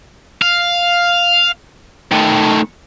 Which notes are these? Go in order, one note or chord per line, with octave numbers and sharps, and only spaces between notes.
F5
D#3 A3